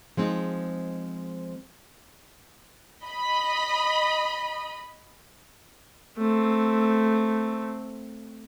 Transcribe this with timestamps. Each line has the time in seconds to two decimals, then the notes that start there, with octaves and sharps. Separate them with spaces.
0.17 F3 G#3 C4 D#4
3.04 D#5 B5
6.18 A3 C4